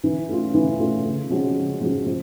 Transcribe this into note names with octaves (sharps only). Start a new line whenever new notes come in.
E3
A3 C#4 F4
E3
A3 C#4 F4
C#3
F3 G#3 C#4 F#4
C#3
F3 G#3 C#4 F#4
F3